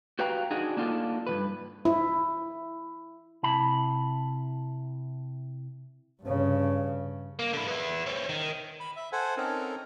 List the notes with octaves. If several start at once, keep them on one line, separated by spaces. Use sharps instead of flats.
F#4 G4 B4 F5 G5 A#5
D4 D#4 F#4 G#4
A#3 D4 D#4 F4 G#4 A4
G2 C#3 B4
E4
C3 E4 A5 B5
G2 C#3
A#3
D3 E4
B3 E4
C4 C#4
D#3
B5
E5
A4 C5 F#5 G#5
C4 C#4 D#4 A4 A#4